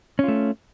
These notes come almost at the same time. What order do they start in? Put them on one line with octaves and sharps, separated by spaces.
C#4 F4 A3